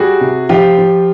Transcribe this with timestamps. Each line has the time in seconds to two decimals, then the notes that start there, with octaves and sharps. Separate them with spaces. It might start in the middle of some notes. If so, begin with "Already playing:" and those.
Already playing: G3 F#4 G#4
0.21 C3
0.49 F3 F4 G4
0.78 F3